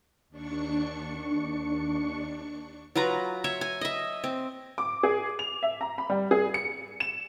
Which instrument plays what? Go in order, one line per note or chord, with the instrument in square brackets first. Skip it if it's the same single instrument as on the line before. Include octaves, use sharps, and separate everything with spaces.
[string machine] D#2 D4 C#6 C#7
[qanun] F#3 F4 B4 A#5
C#5 E5
G#5
D#5 E5
C4
[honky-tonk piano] D6
G#4
F7
E5
A#5
B5
G3
G#4
C#7
E7